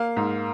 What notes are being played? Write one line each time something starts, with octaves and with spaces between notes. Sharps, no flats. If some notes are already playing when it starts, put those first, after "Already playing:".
Already playing: A#3 F5
G#2